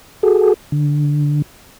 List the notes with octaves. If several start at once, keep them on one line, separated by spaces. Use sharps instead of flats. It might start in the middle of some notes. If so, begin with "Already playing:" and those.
F#4 G#4 A4
D3